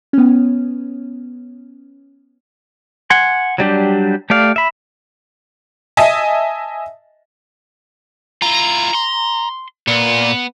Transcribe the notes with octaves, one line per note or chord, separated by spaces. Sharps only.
B3 C#4
F#5 G#5 C6
F#3 G3 D4 G4
A3 G4 D5 F5
E5 B5
D#5 E5 G#5 A5
E4 F4 A#5
C6
A#2 B3